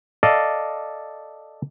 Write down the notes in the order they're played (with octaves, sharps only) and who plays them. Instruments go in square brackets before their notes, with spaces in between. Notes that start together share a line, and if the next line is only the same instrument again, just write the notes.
[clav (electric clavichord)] A4 D5 D#5 F5